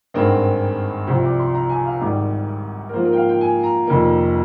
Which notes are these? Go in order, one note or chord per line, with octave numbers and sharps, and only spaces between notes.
G#1 G2 D#3 G#3 C4 A#4
C2 C3 F3 C5
D5
C6
A#5
G#5
F5
G#1 G#2 D#3 G3 D5
A#4
G#2 F3 A#3 F4 C5
A#4
G5
F5
G5
G#5
A#5
F1 F2 D#3 A#3